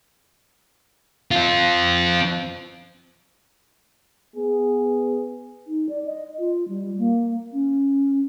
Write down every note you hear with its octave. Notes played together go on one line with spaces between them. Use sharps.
C4 F4
B3 G#4
D#4
D5
D#5
F4
G3
A#3
C#4